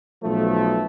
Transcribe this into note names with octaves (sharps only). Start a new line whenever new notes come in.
B1 F3 A3